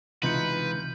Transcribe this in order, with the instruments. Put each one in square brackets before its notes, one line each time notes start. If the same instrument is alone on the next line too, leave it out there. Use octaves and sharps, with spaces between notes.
[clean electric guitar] C#2 C3 E3 [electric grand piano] D#4 F4 C#7 [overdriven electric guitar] B4 [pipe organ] G6